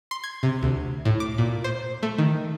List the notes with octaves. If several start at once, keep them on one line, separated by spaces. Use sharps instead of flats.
C6
G#6
C3
D2
A2
D6
A#2
C5
A3
D#3